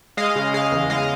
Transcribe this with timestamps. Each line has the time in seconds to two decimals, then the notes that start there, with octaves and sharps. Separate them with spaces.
0.17 G#3 D#5 F5
0.36 C#3
0.54 C#3 D#5 F5
0.72 E2
0.90 G#3 D#5 F5